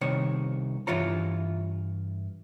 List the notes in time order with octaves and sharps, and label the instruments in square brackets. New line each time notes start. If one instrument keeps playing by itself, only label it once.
[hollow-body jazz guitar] C2 D#3 C#5
G2 E3 F4 C#5 A#5